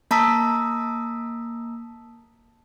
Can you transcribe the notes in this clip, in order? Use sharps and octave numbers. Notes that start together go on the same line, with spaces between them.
A#3 A5 A#5 D#6 E6 B6